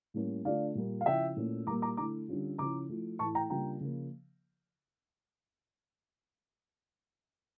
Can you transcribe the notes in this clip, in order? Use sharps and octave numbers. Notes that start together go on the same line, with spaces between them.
A2 G3 A#3 C#4
D3 A3 D4 F4 D5 F5
A#2 G3 A#3
F5
C#3 F3 C#4 E4 E5 G5
A#2 A3 C#4 E4
A#2 G3 A#3 A#5 D6
A#5 D6
D3 A3 E4 A#5 D6
D3 G3 C#4 F4
C#3 F3 C#4 E4 A#5 D6
F3 A3 E4
A2 E3 A3 E4 A5 C#6
G5 A#5
C#3 G3 A#3 D4 F4 G5 A#5
C#3 F3 A#3